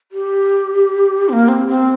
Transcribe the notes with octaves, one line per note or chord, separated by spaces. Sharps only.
G4
C4
A#3
C4
C4